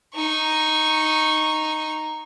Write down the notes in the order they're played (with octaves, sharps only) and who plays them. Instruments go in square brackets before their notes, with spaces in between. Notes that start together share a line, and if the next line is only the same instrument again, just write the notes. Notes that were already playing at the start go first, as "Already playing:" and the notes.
[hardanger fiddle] D#4 C#6